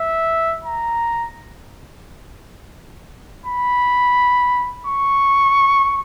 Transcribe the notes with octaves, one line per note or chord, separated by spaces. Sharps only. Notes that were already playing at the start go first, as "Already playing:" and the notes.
Already playing: E5
A#5
B5
C#6